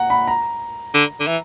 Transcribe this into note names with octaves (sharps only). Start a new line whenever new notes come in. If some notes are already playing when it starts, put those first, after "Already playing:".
Already playing: F#5 A#5
B5
A#5
D3
D3
E3